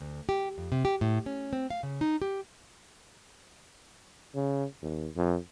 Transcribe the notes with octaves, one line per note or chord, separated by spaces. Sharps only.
D2
G4
F2
C3
G4
A2
C#4
C4
F5
C#3
D#4
G4
C#3
D#2
F2